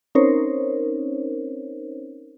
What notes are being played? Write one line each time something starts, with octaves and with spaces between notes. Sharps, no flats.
C4 C#4 D#4 A#4 C5 C#5